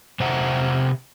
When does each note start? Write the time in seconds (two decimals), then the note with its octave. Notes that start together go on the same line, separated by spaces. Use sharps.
0.20 C3 C5 E5 F#5 A#5